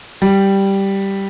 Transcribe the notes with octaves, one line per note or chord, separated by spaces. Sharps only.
G3